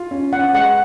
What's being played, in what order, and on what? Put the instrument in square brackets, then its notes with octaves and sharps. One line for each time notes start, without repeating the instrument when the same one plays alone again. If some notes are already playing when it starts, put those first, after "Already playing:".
Already playing: [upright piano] F4
C#4
[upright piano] C#4 [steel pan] F#5
[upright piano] G#3 [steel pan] F#5